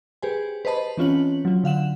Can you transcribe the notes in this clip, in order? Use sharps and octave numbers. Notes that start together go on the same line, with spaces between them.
G4 G#4 B4 C5 G#5
B4 C5 D#5 A5 B5
C5
E3 C4 C#4 F4 C#5 F#7
F#3 F4
D3 F5 F#5 E7